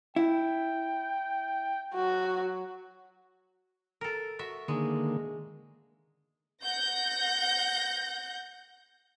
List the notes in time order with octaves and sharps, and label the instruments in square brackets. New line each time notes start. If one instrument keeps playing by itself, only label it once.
[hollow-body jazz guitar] E4 [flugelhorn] G5
[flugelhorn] F#3 [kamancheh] F#4
[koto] A4 A#4
F#4 E5
[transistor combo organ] D3 D#3 A#3 [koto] G#3
[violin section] F#5 G6 A#6